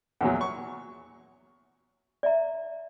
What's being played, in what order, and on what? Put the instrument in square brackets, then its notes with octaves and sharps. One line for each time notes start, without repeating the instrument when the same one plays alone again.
[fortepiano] E2 A#2 F#3 [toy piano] F#5 G#5
[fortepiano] C#6
[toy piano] D5 E5 A#5